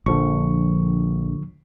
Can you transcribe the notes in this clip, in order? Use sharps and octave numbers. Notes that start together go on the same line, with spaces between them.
A#1 D3 F3 C#6